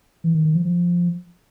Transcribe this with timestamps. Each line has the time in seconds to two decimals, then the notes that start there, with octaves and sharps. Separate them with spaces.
0.24 E3
0.34 D#3
0.45 D#3
0.55 F3
0.65 F3